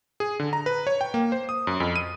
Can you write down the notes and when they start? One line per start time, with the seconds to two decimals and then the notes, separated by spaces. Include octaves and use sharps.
0.20 G#4
0.40 D3
0.53 A#5
0.66 B4
0.87 C#5
1.01 G5
1.14 A#3
1.32 C5
1.49 D#6
1.67 F#2
1.80 F2
1.96 D#7